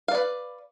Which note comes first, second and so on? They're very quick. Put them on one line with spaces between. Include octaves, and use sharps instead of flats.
F5 D5 B4